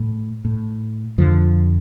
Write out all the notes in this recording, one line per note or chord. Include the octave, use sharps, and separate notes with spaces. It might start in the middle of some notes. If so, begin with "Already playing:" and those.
Already playing: A2
A2
F2 D3 F3